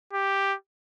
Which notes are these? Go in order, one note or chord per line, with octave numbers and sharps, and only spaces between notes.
G4